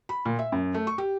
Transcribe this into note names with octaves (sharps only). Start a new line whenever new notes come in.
B5
A#2
E5
F#2
A3
C#6
G4